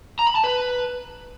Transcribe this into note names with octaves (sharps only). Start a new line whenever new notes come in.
A#5
B5
A5
B4